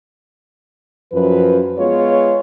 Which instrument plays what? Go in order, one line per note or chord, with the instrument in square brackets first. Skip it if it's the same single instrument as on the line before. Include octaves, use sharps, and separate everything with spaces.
[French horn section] F#2 F3 B4
G#3 B3 F4 C#5